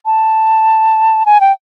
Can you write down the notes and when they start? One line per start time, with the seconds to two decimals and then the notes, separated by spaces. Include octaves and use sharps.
0.06 A5
1.26 G#5
1.41 G5